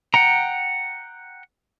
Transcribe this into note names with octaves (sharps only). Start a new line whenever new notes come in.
F#5 G5 A#5